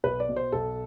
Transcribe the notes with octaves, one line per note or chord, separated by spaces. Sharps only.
B1 B4
D5
B2
C5
B1 A4